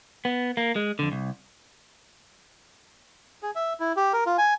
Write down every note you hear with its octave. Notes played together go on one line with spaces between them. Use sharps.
B3
A#3
G#3
F2 D3
C2
G#4
E5
E4
G4
A#4
F4
G#5